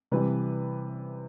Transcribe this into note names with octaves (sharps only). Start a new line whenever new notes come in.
C3 E3 G3 B4